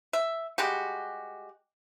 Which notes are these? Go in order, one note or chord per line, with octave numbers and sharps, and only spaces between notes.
E5
G3 G#3 F#4 G4